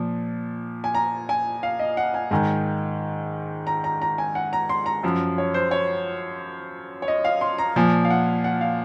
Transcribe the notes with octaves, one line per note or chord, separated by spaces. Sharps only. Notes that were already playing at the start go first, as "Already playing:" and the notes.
Already playing: A#2 F3
G#5
A#5
G#5
F5
D#5
F#5
G#5
G#2 D#3 G#5
A#5
A#5
A#5
G#5
F#5
A#5
C6
A#5
F#2 F3
C#5
C5
C#5
C#5
D#5
F5
C6
A#5
A#2 F3 G#5
F5
F#5
F#5
F5